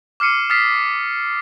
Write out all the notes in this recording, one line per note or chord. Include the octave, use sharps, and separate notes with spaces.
D6 F6 C7 C#7 D#7
D#6 F6 A6 B6 C7